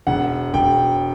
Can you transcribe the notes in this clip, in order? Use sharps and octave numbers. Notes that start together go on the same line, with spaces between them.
E1 F#5
E1 G5